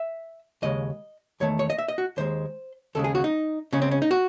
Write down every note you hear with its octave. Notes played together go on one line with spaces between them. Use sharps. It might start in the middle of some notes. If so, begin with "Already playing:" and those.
Already playing: E5
D#2 C#3 G#3 D#5
E2 D#3 A3 C#5
C#5
D#5
E5
D#5
F#4
D#2 D#3 G#3 C5
D#2 C#3 G#3 A4
G#4
F#4
D#4
C#2 C#3 G#3 C#4
C4
C#4
D#4
F#4